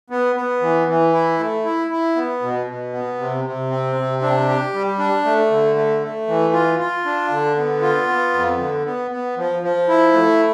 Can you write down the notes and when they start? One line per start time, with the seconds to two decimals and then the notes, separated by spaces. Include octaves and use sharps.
0.10 B3
0.36 B3
0.62 E3
0.87 E3
1.13 E4
1.39 A3
1.64 E4
1.91 E4
2.16 B3
2.42 B2
2.67 B2
2.93 B3
3.19 C3
3.45 C3
3.70 C4
3.96 C3
4.22 D4
4.48 G4
4.74 G3
4.99 D4
5.24 A3
5.51 D3
5.76 A3
6.02 A3
6.28 E3
6.53 F4
6.79 F4
7.05 D4
7.30 D3
7.57 B3
7.82 F4
8.08 B3
8.34 F2
8.59 D3
8.85 B3
9.11 B3
9.37 F3
9.63 F3
9.89 E4
10.13 A3